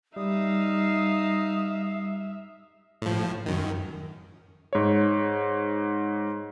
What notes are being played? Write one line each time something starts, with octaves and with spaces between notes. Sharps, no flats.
G3 D#4 E5 F5 D#6
A2 F3
F#2 D#3
G#2 C#5